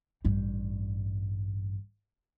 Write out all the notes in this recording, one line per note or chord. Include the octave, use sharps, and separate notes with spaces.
A1 G2